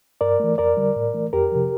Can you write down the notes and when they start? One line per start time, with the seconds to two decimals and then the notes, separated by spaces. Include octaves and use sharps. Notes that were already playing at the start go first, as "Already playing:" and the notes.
0.21 G2 A#4 D5
0.40 E3 A3
0.58 F2 A#4 D5
0.77 D3 G3
0.96 A2
1.14 E3 A3
1.33 F2 G4 A#4
1.52 C3 F3